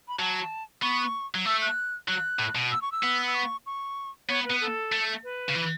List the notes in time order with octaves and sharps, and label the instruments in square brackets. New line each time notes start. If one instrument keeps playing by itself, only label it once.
[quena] B5
[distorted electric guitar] F#3 [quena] A5
[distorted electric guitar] B3 [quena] C#6
[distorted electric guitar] F#3
[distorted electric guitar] A3 [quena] E6
[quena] F#6
[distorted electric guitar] F#3 [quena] F#6
[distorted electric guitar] A2
B2
[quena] E6
C#6
E6
[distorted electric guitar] B3
[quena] E6
C#6
C#6
[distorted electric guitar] B3 [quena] C#5
[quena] B4
[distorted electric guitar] B3
[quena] A4
[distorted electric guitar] A3
[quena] B4
[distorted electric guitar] C#3
E3